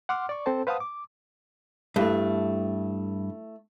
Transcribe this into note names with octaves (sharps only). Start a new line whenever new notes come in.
F#5 C6 D6 F6
D5 C#6
C4 A4 C5 A5
B4 C5 F5 F#5 A5 D#6
D6
G2 A3 E4 B4